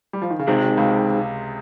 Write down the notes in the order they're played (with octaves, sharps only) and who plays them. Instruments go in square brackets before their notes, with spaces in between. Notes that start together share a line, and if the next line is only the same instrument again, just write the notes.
[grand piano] G3
F3
D#3
C#3
[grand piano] C3 [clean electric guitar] D#3 G#3 C4
[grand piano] C#2 C#3